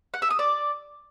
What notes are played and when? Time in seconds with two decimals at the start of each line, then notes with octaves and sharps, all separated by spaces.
0.14 F#5
0.22 E5
0.31 D#6
0.39 D5